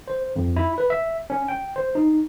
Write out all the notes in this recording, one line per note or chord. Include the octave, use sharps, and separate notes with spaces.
C5
F2
E4
B4
E5
C#4
G5
C5
D#4